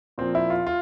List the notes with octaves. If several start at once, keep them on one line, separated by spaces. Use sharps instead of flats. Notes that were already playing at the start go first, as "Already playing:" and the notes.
A#2 F3 C4
E4
F4
F4